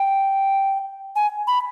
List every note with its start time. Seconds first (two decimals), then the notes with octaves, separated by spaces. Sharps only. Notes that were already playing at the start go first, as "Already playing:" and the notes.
Already playing: G5
1.16 G#5
1.47 B5